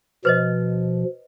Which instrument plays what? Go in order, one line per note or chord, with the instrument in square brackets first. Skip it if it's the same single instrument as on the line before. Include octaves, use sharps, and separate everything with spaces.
[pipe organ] B2 F3 [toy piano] B4 C5 D#5